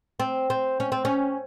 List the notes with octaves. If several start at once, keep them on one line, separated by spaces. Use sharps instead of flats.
C4
C4
C#4
C4
C#4